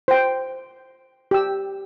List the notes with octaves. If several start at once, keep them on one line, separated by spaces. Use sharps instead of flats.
C5 G5
G4 E6